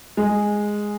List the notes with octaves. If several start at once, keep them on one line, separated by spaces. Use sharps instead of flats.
G#3